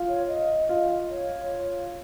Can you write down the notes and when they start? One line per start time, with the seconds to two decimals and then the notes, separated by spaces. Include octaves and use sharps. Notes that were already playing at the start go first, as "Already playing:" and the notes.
Already playing: F4
0.08 C#5
0.28 D#5
0.69 F4
1.10 C#5